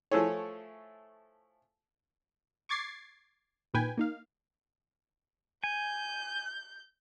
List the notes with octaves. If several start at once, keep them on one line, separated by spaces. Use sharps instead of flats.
F3 A3 E4 G#4 A4 C#5
C#6 D6 G#6 A6 C7
A#1 A#2 D#3 B4 G5 G#5
A#3 D#4 F5
G#5 G6